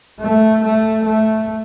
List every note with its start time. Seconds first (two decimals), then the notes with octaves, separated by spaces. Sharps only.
0.21 A3
0.63 A3
1.05 A3